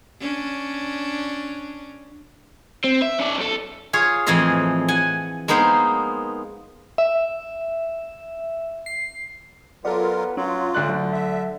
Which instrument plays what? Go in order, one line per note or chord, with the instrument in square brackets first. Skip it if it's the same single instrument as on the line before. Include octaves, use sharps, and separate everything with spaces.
[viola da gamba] C#4 D4
[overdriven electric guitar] C4
E5
C#4 D5
B1 A4
[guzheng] F4 G#4 C#5
F2 A2 E3 G#4 D#5 C6
F#5 G#5
G#3 A#3 B3 D#4 C5
[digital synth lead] E5
C7
[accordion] F#3 F4 A#4 [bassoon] B3 [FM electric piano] A4 D5
[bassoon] F#3 [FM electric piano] C#4 [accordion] F4
[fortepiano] D2 D5 F#6
[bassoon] D3 [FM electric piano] F#3
[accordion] E5